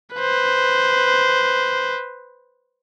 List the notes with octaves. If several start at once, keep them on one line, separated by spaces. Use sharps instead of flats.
B4 C5